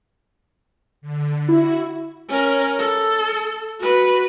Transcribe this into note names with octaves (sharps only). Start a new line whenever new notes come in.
D3
E4 F#4
C#4 A#4
A4
F#4 B4